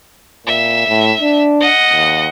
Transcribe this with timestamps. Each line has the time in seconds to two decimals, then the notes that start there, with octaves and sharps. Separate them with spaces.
0.46 A#2 E5
0.88 A2
1.21 D4
1.60 D#5 F#5
1.92 D#2